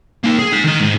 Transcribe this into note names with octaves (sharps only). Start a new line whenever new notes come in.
A#3 D#4
G#4
D#4 G#5
D#3 D#5
G#2